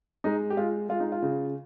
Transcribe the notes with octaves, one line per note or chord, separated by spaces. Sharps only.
G#3 D#4
G4
G#3 F4
G#3 F4
D#4
F4
C#3